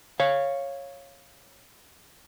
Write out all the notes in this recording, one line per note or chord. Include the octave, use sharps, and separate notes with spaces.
C#5 F5